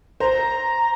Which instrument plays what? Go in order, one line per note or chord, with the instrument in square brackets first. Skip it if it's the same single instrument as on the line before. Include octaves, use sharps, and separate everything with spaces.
[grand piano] C5 [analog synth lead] A#5